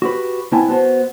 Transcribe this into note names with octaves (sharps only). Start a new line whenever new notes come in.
F#4 G4 B4
C2 B3 C4 E4 G#5 A5
B3 F#4 C5